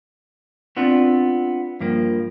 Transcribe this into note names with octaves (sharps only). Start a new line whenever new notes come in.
B3 C4 D4 F4
G2 F3 A#3